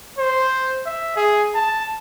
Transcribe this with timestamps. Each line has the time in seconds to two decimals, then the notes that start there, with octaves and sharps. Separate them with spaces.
0.19 C5
0.86 E5
1.16 G#4
1.55 A5